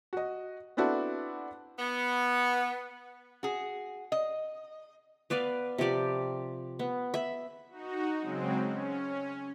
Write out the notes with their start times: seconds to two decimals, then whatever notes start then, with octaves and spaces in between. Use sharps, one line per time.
0.13 F#4 D#5
0.77 B3 C4 D4 E4 F#4 A4
1.78 B3
3.43 F#4 G#4
4.12 D#5
5.30 B3 B4 D5 F5
5.78 C3 F3 G4 D5
6.79 B3
7.14 E5 B5
7.70 D#4 F#4
8.21 C#3 F#3 G#3 C4
8.66 C#4